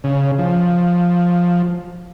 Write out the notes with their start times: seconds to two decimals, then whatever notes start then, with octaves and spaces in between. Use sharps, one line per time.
0.04 C#3
0.38 F3